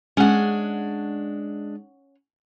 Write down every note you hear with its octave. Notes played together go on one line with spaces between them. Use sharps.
G#3 C#4 D4 F#5